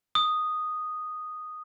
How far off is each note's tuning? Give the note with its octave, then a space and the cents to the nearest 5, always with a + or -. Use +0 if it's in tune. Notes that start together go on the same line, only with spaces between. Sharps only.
D#6 -5